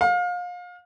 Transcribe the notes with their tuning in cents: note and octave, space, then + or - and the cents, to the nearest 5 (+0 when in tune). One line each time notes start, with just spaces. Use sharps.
F5 +30